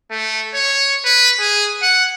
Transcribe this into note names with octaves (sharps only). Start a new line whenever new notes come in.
A3
C#5
B4
G#4
F#5